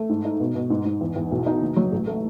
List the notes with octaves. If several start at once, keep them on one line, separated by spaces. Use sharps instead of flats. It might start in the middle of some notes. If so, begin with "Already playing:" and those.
Already playing: A3
G#2
D#4
B2
B2
G#2
G#2
E2
E2
B1
D#4
F#1
F#3
A1
A3